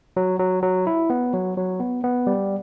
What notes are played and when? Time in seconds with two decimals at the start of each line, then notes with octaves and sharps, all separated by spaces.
0.17 F#3
0.39 F#3
0.63 F#3
0.87 E4
1.10 B3
1.34 F#3
1.57 F#3
1.80 B3
2.04 B3
2.27 G3